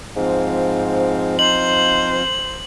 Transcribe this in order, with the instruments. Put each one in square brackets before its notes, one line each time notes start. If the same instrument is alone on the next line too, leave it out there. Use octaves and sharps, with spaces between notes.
[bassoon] G#2 [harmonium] F3 C4 F5
[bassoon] D#4 [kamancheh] C5 [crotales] F#7